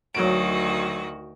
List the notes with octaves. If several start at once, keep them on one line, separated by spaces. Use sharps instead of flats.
D2 D#3 F#3 F#4 D7